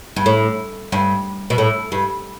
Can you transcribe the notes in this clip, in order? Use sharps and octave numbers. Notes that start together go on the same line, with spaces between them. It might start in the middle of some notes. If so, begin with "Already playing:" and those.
G2
A2
G2
B2
A2
G2